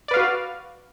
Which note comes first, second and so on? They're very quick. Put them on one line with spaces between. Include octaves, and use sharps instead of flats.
D5 B4 F5 F#4